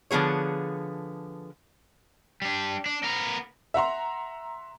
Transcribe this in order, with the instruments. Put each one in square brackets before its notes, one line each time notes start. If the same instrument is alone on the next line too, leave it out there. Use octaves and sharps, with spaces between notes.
[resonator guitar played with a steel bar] D3 F3 B3 G#4 C#5
[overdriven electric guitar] G3 D4
D4
B3 A#4
[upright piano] E5 F#5 A#5 C6